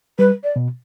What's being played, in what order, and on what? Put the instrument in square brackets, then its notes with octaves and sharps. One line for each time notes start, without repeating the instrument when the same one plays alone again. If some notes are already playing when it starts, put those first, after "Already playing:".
[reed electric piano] G3 [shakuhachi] B4
[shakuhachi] D5
[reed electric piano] B2